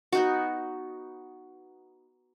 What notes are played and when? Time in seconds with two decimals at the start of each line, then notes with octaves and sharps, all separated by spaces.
0.13 B3 D#4 F#4